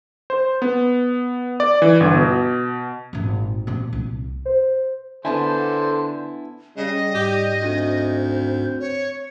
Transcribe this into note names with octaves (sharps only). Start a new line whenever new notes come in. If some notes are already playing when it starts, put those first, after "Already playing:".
C5
B3
D5
E3
G1
B2
G#1 A#2
A#2 C4
C2
C5
D3 B3 D4 E4 A4 C5 G#5 A5
C#3 G3 D#5
G#2 G4 G6
D2 C4
C#5